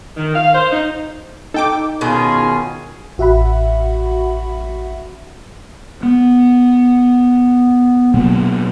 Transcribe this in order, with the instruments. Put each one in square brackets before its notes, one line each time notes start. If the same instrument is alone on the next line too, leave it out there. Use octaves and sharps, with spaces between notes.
[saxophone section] D#3
F5
C5
D#4
[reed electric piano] D#4 [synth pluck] A4 G5 D6
[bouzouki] B2 D#3 [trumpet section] C#4 F4 G#4
[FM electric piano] A1 F#4 E5 F#5 B5
[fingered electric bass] B3
B2 F#3 A#3 B3